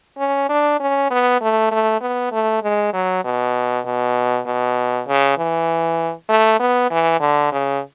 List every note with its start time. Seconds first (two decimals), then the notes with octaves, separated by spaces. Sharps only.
0.18 C#4
0.49 D4
0.80 C#4
1.10 B3
1.41 A3
1.71 A3
2.01 B3
2.32 A3
2.63 G#3
2.93 F#3
3.24 B2
3.85 B2
4.46 B2
5.07 C#3
5.38 E3
6.29 A3
6.60 B3
6.91 E3
7.20 D3
7.52 C#3